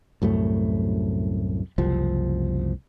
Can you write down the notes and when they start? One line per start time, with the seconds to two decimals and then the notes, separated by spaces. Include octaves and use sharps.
0.22 C2 F#2 A2 A3
1.78 F#1 C2 F3